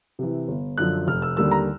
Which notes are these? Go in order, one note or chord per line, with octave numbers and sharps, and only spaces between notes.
C3 E3
G1
F#2 D3 F3 F#6
F1 F6
E6
D#2 D3 G3 A#3 E6
A#5